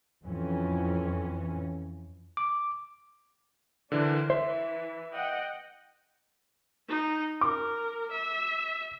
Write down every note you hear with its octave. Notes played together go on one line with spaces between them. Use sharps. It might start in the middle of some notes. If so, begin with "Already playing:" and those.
F2 E3 C#4
D6
D3 E3 D4 A#4 C5
E3 C5 E5
D#5 F#5 G5
D#4
A#4 D6
E5